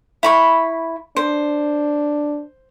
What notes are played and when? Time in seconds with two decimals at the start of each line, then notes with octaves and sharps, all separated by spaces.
0.23 E4 B5 C#6
1.17 D4 C5